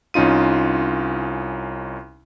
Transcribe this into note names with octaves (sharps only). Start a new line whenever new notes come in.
C2 C#4 D#4 F4 D#7